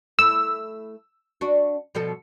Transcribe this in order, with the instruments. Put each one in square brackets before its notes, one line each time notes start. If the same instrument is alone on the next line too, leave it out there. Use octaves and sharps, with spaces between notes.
[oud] A3 E4 [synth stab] E6
[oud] D4 F#4
B2 F3 A4